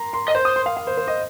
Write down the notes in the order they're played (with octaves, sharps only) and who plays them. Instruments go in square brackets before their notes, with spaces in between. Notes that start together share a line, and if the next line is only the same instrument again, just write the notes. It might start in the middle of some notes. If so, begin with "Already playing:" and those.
Already playing: [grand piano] A#5 C6
C6
[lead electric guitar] D#5
[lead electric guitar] C5 [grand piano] C6
[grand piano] D#6
C6
F5
F5
C5
C5
D#5